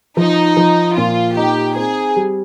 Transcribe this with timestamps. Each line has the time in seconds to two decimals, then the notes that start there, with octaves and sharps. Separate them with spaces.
0.17 F3 D#4
0.57 F3
0.97 A#2 F4
1.37 D#4 G4
1.76 C4 G#4
2.16 G3